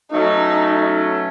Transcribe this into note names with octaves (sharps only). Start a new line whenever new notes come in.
B2 F#3 A3 C#4 D#4